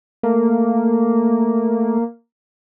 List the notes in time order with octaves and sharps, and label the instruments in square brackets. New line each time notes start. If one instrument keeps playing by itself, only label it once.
[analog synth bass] A3 [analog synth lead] A#3